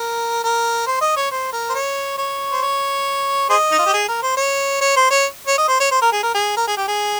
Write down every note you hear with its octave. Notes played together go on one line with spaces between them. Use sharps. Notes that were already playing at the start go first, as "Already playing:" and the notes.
Already playing: A#4
A#4
C5
D#5
C#5
C5
A#4
C5
C#5
C#5
C5
C#5
G#4 C5 D#5
D#4
F4
G4
G#4
A#4
C5
C#5
C#5
C5
C#5
C#5
D#5
C5
C#5
C5
A#4
G#4
A#4
G#4
A#4
G#4
G4
G#4